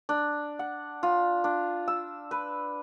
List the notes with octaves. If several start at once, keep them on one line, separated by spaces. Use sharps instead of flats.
D4
F#5
F4
D4
E6
B4